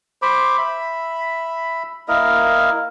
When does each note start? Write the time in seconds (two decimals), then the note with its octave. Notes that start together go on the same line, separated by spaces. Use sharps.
0.22 C5 B5 D6
0.58 E5 B5
2.08 A#3 E4 A#4 D#5